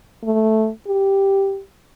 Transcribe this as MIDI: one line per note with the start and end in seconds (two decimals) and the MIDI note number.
0.24 0.69 57
0.87 1.61 67